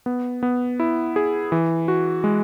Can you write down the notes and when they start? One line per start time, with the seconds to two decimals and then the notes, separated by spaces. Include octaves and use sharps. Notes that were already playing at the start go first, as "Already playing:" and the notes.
0.06 B3
0.43 B3
0.80 E4
1.16 G#4
1.52 E3
1.88 F#4
2.24 G#3